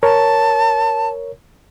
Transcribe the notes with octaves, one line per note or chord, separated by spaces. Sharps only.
A#4 C#5 A5